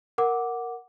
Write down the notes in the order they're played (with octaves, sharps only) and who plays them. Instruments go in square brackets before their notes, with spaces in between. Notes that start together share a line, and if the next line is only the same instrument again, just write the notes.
[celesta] A#4 F#5 D6